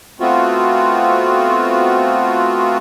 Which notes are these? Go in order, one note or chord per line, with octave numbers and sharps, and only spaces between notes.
A3 B3 C4 F4 F#4